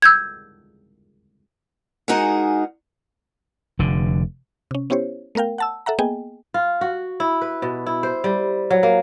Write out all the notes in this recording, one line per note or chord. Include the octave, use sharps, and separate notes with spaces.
E6 G6 G#6
G#3 D#4 F#4 G#4 A#4 F#5
F1 D3
C3 C#4
B3 C#4 E4 G4 C5 C#5
A3 B3 A#4 F5 G5
F#5 A5 E6
A4 E5 F#5 A#5
A#3 B3 G#4 D#5 G5 G#5
F4
F#4
E4
B4
B2
E4
C5
G3
F#3
A#3